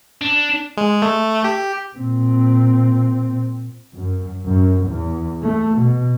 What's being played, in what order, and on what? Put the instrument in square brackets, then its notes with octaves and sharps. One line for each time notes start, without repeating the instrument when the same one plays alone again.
[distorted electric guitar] D4
[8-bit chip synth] G#3
A3
G4
[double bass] A#2 C4
[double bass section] F#2
F#2
E2
A3
B2